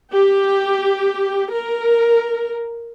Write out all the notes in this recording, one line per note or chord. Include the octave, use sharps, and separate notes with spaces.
G4
A#4